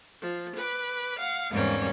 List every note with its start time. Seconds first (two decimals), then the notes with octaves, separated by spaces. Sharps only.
0.22 F3
0.55 B4 D6
1.18 F5 F#5
1.51 E2 G#2 G3 A#3 C4 C#4